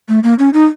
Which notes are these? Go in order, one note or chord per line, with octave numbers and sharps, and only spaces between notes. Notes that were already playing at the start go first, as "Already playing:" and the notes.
A3
A#3
C#4
D#4